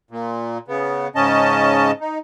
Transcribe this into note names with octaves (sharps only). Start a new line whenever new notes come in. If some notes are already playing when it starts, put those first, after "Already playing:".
A#2
C#3 B3
G#2 C#3 C#4 D#5 A5
D#4